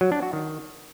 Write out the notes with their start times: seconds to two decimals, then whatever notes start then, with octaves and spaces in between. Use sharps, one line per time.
0.01 F#3
0.12 D4
0.22 F#4
0.33 D#3